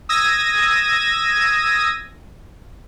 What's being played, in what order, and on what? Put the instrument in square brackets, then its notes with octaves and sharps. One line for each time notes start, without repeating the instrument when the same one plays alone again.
[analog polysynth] D#6 E6 G#6 A#6 D#7